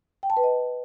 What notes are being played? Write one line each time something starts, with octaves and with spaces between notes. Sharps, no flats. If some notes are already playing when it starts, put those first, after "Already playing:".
G5
A5
B4
D#5